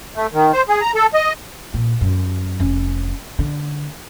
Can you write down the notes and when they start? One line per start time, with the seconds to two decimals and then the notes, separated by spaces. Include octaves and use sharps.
0.16 A3
0.33 D#3
0.53 C5
0.69 G#4
0.81 A#5
0.95 A4
1.14 D#5
1.74 A#2
2.01 F#2
2.59 F1 C#4
3.39 D3